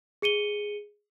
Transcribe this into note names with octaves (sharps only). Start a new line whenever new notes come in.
G#4 C#7 D#7 G7